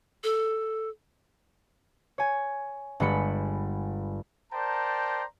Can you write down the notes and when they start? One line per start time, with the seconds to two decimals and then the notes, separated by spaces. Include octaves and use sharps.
0.24 A4
2.18 C#5 G#5
3.00 G1 G3 G#3 B5 C#7
4.51 A#4 C5 D5 G5 A5 A#5